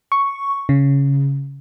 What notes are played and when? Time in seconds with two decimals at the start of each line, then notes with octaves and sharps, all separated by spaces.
0.12 C#6
0.69 C#3